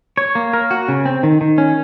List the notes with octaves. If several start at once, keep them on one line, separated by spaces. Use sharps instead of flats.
C#5
A#3
A#4
F#4
C#3
C4
D#3
D#3
C#4